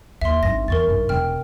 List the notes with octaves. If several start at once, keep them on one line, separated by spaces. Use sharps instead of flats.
D#2 E5 C6
G#1 G2 A#6
E2 A#4 C#6 A6
B1 G2
E1 G5 F6